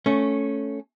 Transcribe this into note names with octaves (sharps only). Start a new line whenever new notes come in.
A3 C#4